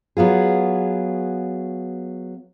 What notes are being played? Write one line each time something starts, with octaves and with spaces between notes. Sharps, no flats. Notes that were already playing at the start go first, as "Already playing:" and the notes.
F#3 B3 F4 G#4